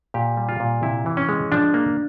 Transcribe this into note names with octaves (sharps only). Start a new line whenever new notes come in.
A#2 G4
G3
F4
A#2
C3 E4
E3
C#4
G#3
F3 D4
A#3